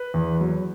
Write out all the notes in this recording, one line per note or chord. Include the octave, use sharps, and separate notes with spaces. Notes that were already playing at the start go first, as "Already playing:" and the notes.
Already playing: B4
E2
F#3